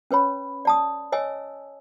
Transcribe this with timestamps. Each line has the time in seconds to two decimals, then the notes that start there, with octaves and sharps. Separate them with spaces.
0.11 C#4 B4 C#5 B5
0.65 D5 A5 D#6
1.12 C#5 D#5 G#5 E6